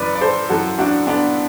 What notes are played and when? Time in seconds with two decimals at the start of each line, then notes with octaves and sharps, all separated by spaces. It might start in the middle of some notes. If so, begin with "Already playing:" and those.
Already playing: F#2 E3 B4 D5
0.15 D5
0.21 A4 C5
0.49 F#2 E3 F#4 A4
0.79 D4 F#4
1.07 B3 D4